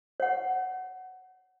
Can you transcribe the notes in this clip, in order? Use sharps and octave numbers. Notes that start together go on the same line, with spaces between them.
C#5 F#5